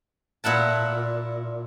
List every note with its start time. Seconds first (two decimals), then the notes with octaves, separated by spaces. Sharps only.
0.44 A#2 E4 F#5 A5